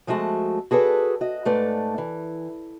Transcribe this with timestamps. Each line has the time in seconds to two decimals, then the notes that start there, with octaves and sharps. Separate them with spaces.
0.07 F3 G#3 A3 F#4 A5
0.71 F#4 G#4 A4 B4 D5
1.21 F#4 D#5
1.45 G#2 A3 B4 D5
1.98 E3